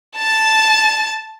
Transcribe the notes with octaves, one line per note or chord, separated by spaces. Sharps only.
A5 A6